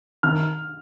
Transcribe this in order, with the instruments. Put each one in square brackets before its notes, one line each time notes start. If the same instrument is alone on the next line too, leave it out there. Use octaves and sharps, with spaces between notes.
[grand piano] D#3 [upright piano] F6